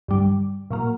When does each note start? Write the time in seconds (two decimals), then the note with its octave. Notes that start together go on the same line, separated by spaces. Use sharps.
0.08 G2 D3 G3
0.71 A#2 F#3 A#3